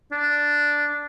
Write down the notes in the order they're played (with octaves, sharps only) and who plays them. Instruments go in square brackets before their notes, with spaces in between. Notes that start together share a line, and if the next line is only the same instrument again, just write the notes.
[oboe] D4